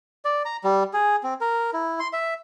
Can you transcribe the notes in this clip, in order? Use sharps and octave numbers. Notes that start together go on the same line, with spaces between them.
D5
A#5
G3
G#4
C4
A#4
E4
C6
E5